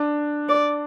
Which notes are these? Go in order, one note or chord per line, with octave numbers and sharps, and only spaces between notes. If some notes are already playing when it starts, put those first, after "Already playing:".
Already playing: D4
D5